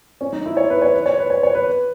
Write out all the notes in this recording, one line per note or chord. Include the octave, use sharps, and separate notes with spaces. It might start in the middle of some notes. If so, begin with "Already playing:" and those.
C#4
D#4
E4
C#5
B4
C#5
B4
C#5
B4
C#5
C#5
B4